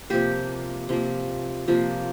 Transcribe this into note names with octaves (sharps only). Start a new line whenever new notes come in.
C3 F3 A#3 G4
C3 F3 A#3
C3 F3 A#3